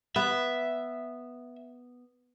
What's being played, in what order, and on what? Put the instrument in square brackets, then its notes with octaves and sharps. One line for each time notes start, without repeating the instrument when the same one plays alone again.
[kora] B3 [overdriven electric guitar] E5